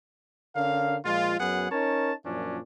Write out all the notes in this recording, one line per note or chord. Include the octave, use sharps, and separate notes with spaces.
D3 C#4 A#4 F5
A#2 F3 G#3 F4
F#2 F#3 B3 G#4 F#5
C#4 D#4 A#4 C#5 A5
F#2 A#2 F3 C#4 D4